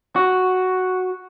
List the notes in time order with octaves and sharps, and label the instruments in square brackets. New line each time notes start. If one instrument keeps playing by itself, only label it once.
[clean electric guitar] F#4